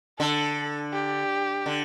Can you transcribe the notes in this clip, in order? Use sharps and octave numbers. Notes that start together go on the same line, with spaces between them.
D3 A4
G4
D3